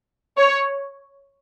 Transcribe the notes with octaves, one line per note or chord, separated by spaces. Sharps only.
C#5